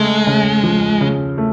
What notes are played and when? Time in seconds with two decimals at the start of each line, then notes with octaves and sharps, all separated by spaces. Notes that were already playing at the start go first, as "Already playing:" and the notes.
Already playing: C#3 G#3 A3
0.27 C#3
0.63 F3
1.01 C#3
1.38 A3